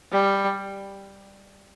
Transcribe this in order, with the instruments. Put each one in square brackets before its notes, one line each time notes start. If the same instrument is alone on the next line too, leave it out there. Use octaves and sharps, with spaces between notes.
[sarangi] G3